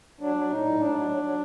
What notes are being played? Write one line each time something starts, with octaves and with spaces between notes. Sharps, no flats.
F#3 D4
F#3
A2 D#4
A2
A2 D4
F#3
F#3
F#3